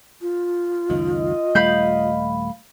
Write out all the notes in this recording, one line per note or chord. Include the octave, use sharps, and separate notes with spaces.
F4
C#2 F#2 D#3 D#5
D#1 G3 A3 F5 B5 G6